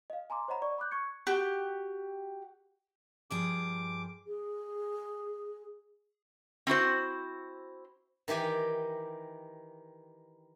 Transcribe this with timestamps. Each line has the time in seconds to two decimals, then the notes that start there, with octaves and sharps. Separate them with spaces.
0.10 D#5 F5
0.30 G#5 A#5 C6 D6
0.48 C5 C#5 D#5 F#5 A#5 B5
0.62 D5 C#6
0.78 B5 D6 F#6 G6
0.91 C#6 G#6 C#7
1.27 F#4 G4
3.31 G2 F3 G#4 D6
4.27 G#4
6.67 C4 E4 F#4 C5
8.28 D#3 E3 G4 G#5